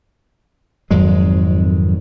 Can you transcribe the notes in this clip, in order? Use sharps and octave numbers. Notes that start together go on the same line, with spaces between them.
G#1 F2 F#3 G#3